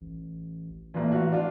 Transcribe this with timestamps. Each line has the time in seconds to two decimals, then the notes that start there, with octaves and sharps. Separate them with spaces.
0.01 A1
0.94 A1 A#2 E3
1.12 F#4 F5
1.32 D4 F4